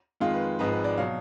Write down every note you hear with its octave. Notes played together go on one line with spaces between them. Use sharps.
F2 D#3 G#3 F4
B4
G#1 G#2 F3 G#3 B4
B4
D5
B2 F#3 F5